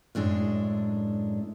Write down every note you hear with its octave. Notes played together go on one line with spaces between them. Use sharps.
F#2 A2 G#3 D4